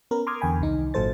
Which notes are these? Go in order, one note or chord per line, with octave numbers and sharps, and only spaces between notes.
B3 C#4 A#4 B4
A#5 C6 D6 D#6 F6 G#6
E2 D3 G5 G#5 B5
C2 D#3 D#4
G#1 A#2 F#3 A4 C5 A6